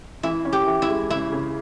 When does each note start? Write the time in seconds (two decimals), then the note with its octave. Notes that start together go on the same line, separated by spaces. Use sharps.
0.23 E3 E4
0.45 C#4
0.53 G4
0.66 E3
0.82 E4
0.89 G#3
1.10 C#3 E4
1.32 C#3